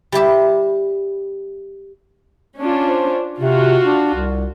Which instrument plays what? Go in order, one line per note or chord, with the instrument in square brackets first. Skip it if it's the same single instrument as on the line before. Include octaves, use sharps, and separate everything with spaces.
[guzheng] G3 E4 G4 E5
[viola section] C#4 D4 F4
[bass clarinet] C5
[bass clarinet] C3 [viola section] F4 F#4
[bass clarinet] D4
C2